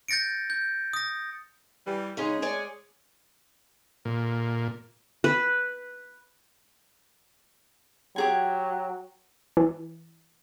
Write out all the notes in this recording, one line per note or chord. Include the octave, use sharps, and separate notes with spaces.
G6 A6 A#6 C#7 D7
G6
D#6 A#6
E3 G3
C#3 G#3 C#4 D#4 G#4
C#5 D5 G#5
A#2
B4
F#3 G4 G#4 G#5
E3